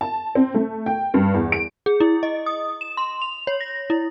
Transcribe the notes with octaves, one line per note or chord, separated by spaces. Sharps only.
A5
C4
A3
G5
G2
E2
D7
G#4
E4
D#5
D#6
E7
C6
F7
C#5
A#6
E4